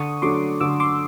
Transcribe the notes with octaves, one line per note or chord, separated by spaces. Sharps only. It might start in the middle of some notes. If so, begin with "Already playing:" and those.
Already playing: D3 C#6 D#6
F#3 A3 D4 C6 D6
D3 D6 E6
C6 D6